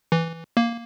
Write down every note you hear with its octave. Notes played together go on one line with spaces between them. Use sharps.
E3
A#3